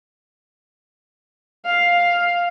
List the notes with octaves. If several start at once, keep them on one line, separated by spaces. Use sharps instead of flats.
F5